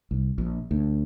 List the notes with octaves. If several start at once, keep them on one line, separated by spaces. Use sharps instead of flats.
C2
A#1
D2